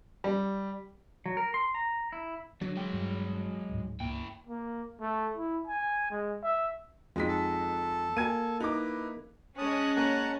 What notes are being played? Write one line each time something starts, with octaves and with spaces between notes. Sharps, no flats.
G3
F#3
A#4
C6
A#5
E4
D3 F#3
G#3 G5
G2
D1 G#2
G1 C#2 A#3 E4 G5
A#3
A3
E4
G#5
G#3
E5
F2 G#3 D#4 B6
A4
A#3 G#5 G#6 D#7
D#4 E4 B4 D6
G#3 C#4 A5 D#6 F#6
A#3 A#4 F#5 A5 A#5